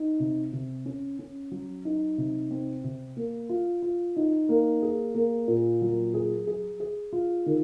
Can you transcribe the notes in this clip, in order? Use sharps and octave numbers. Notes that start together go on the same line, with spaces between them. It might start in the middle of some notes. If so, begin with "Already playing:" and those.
Already playing: D#4
C3
C3
C#4
C#4
F#3
D#4
C3
C4
C3
A#3
F4
F4
D#4
A#3
G#4
A#3
A#2
F#3
G#4
G#4
G#4
F4
D#3